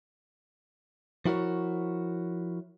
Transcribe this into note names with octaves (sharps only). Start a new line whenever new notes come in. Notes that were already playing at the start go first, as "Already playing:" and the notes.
F3 E4 F#4 A#4 C#5